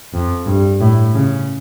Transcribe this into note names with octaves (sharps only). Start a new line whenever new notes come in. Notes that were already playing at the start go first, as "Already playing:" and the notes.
F2
G2
A2
C#3